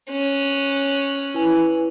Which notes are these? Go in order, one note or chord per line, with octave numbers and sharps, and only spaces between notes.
C#4 F#6
E4 B4 G#5